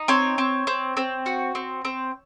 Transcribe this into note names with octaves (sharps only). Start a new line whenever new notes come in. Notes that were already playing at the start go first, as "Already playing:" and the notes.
Already playing: D#4
C4 C#5
C4
C4
C4
F#4
C4
C4